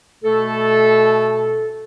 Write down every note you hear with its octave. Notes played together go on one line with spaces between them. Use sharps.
B2 A3 A4